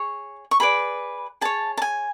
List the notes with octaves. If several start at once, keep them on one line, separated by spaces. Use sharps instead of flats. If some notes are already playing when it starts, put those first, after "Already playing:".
Already playing: G#4 C#5 C#6
C#6
G#4 B4 D5 B5
G#4 C#5 A5
A5
G#5